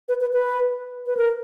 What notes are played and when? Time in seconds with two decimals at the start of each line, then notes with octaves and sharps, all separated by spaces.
0.09 B4
0.21 B4
0.33 B4
1.06 B4
1.17 A#4